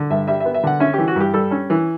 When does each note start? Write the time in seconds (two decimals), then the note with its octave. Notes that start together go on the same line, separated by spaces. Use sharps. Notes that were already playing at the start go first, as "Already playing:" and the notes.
Already playing: D3
0.10 G2 E5
0.28 G3 E5
0.40 E5
0.45 B3
0.54 E5
0.63 D3 F#5
0.80 C#4 E5
0.94 G4
0.98 E3
1.08 F#4
1.16 G2 G4
1.34 G3 A4
1.51 C#4
1.70 E3